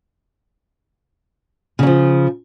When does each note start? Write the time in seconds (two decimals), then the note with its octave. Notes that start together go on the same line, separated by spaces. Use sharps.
1.79 C#3
1.83 F#3
1.87 F3